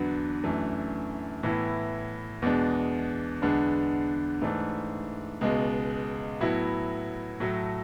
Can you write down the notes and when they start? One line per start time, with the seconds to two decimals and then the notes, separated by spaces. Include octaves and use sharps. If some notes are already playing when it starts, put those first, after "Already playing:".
Already playing: E2 D3 F#3 B3 D4
0.43 F#2 E3 A3 D4
1.43 A2 E3 B3 E4
2.42 E2 B2 G#3 D4
3.42 E2 D3 G#3 B3 D4
4.42 G#2 E3 A3 D4
5.41 C#2 B2 G#3
6.40 A2 F#3 B3 E4
7.40 A2 F#3 A3